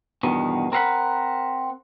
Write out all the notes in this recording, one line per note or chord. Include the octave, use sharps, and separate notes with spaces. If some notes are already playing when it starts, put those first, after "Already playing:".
E2 G2 B2 D#3 B3
C4 A#4 B4 F5 F#5 B5